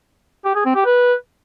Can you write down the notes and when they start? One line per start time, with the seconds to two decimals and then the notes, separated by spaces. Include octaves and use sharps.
0.45 G4
0.55 G#4
0.65 C4
0.75 G4
0.85 B4